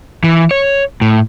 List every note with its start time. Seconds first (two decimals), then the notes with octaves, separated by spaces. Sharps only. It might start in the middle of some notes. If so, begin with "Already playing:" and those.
0.24 E3
0.51 C#5
1.01 A2